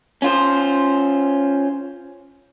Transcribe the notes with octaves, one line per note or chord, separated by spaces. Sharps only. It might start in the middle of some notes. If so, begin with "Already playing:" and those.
C#4 F4 C5